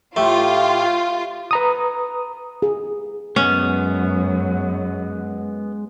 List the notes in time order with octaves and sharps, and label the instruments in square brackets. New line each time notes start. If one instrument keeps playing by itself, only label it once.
[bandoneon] A2 G4 [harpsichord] A3 [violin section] F4
[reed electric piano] B4 A#5 D#6
[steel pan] G#4
[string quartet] F#2 [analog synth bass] G#3 [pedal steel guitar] B3 [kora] C#4